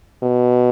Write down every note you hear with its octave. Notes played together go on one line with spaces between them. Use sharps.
B2